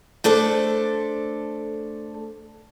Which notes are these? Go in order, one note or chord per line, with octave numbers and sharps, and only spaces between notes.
A3 D4 A4 C5